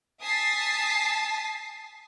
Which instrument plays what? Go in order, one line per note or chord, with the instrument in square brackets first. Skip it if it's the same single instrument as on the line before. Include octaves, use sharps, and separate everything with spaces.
[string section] G#5 A5 D#6 A6 B6 C7